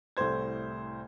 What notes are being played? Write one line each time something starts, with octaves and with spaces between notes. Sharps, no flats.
C2 A2 A3 C5 G#6